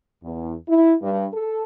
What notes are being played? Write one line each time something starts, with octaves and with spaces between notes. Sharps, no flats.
E2
E4
G2
A4